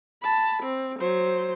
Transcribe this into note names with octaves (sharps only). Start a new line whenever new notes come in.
A5 B5
C4
F#3 C5